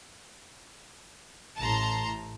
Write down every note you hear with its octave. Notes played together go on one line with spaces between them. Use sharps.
A1 A2 A5 A#5 C6